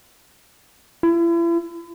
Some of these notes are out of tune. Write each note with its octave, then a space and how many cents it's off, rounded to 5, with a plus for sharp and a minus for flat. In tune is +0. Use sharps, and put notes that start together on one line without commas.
E4 +40